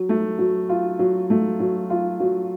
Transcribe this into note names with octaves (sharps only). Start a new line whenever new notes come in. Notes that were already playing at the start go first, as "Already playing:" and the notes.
Already playing: F#3
A3
F#3
F4
F#3
A3
F#3
F4
F#3